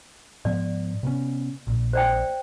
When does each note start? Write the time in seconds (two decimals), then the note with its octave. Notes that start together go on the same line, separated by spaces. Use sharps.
0.45 G#2 F3 B3 D5
1.03 C3 B3 C#4
1.67 A#1 A#2
1.93 C5 D5 G5